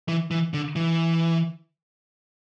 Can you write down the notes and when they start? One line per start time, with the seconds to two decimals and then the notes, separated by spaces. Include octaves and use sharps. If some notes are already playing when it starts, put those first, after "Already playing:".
0.08 E3
0.31 E3
0.54 D3
0.76 E3